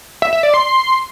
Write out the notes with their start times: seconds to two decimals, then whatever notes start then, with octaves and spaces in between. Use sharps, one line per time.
0.22 E5
0.33 E5
0.43 D5
0.54 C6